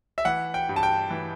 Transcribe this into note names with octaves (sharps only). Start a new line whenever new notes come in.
E5
E3 F#5
G5
G2
A5
G5
E3